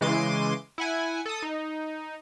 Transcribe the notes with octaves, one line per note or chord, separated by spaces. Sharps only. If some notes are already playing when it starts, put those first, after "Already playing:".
C#3 E3 G#3 C6 D6 D#7
E4 F#5 G#5
A4 D#6
D#4